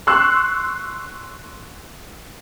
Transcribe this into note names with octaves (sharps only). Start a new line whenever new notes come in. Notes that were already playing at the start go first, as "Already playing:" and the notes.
C6 C#6 E6 F#6